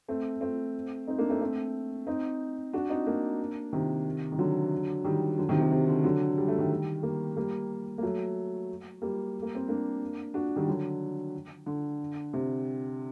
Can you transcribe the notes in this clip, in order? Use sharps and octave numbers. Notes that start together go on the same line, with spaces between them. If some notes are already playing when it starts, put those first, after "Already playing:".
A3 C4
A3 C4
C4 D#4
A#3 D4
A3 C4
A3 C4
C4 D#4
D4 F#4
C4 D#4
A#3 D4
C3 D#3
D#3
D3 F#3
D#3 G3
D3 F#3
C3 D#3
C3
C3
D3
D3 F#3
G3
A3
D#3 G3
G3 A#3
G3 A#3
A#3
F#3 A3
G3 A#3
A#3
C4
A#3 D4
D4 F#4
D#3 G3
D3 F#3
D3
C3